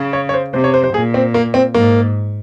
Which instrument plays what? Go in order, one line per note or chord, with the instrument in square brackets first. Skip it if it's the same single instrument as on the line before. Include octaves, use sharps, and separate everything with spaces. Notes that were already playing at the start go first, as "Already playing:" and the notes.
Already playing: [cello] C#3
[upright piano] C#5
C#5
C5
[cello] C3 [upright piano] C5
[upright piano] C#5
C5
C5
[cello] A#2 [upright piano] G#4
[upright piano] C4
A#3
C4
[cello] G#2 [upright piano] A#3